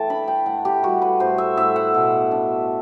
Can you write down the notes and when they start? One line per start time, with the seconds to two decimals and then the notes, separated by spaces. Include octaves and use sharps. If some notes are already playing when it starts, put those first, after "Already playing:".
Already playing: E3 A3 G5 A5
0.10 D4 B5
0.28 G5
0.46 A2 F#5
0.65 G4
0.83 G3 F#4
1.02 B4
1.20 A2 C5
1.38 E5
1.57 A2 E5
1.76 F#5
1.94 B2
2.31 D4